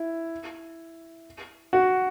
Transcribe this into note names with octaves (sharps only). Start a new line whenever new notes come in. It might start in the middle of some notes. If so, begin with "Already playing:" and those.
Already playing: E4
F#4